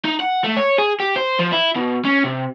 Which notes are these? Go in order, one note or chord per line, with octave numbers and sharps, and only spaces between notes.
D#4
F#5
A3
C#5
G#4
G4
C5
F3
E4
B2
C#4
C3